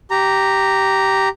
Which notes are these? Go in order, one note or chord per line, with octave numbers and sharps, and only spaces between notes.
G4 A#5